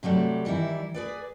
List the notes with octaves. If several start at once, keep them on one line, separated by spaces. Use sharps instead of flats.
C3 F#3 G3 A3
D#3 E3 G3 E4
G#4 B4 D5